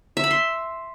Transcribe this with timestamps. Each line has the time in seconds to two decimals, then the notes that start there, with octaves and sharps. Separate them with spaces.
0.17 E5
0.24 B5
0.31 C6